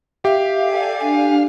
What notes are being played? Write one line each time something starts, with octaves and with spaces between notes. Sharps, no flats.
G4 E5 F5
A4 D5 G#5
D4 G#5